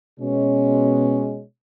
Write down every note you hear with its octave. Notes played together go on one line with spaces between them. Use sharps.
B2 G#3 C#4